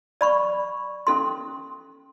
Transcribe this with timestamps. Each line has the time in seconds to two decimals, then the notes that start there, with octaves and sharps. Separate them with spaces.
0.21 D5 B5 C#6
1.07 C#4 A4 C6